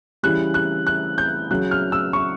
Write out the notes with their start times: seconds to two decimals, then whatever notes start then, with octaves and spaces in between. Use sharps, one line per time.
0.23 C#3 E3 G3 F#6
0.54 F#6
0.87 F#6
1.18 G6
1.51 C#3 F#3 F#6
1.71 F6
1.92 E6
2.13 C#6